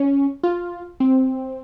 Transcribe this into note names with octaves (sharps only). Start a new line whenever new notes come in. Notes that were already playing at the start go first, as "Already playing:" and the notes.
Already playing: C#4
F4
C4